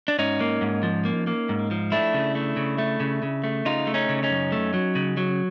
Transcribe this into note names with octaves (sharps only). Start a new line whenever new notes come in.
D4
G#2 C#4 D#4
A#3
G#2
F3
A#3
A#3
G#2
F3
A3 D4 E4
C#3
A3
C#3
A3
C#3
C#3
A3
C#3 D#4 F4
A3
C#4 D#4
C#3
C#4 D#4
F#2
A3
F#3
C#3
F#3